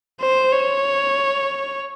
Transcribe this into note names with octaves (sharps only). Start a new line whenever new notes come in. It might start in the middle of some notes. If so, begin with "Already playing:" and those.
C5
C#5